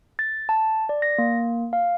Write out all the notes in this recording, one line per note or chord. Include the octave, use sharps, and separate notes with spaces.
A6
A5
D5
A#6
A#3
F5